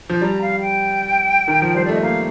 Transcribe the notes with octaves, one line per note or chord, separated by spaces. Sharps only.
F3
G3 A#5
F5
G5
D#3
F3
G3 C5
A3 D5
D#5
A#3 F5